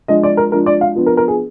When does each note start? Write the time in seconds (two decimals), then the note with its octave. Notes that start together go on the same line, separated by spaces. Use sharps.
0.08 F3 G#3 D4 D#5
0.23 D5
0.37 A#4
0.52 F3 G#3 D4 A#4
0.66 D5
0.81 F5
0.95 F3 B3 D4
1.06 A#4
1.17 A#4
1.28 G#4